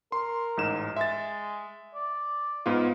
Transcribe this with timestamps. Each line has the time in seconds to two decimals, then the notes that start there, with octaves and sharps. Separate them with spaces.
0.12 A#4 C6
0.57 A1 G#2 E7
0.96 G#3 E5 A6
1.95 D5
2.66 G#2 B3 F4